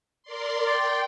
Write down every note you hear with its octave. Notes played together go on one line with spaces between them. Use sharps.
A#4 D5 C6
D5 G5 C6